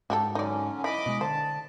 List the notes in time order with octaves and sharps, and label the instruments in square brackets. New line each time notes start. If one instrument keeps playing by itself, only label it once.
[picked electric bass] G#2 [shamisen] F#4 G4 A4
[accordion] D3 F#3 C#4 [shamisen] D#4 D5
[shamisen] E3 [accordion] D#5 B5 D6
[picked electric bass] B2 G#3
[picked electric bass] D3 [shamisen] C5 [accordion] A5